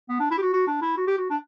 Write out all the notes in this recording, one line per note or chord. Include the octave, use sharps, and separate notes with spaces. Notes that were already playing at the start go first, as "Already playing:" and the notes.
B3
D4
E4
G4
F#4
F#4
D4
E4
F#4
G4
F#4
D4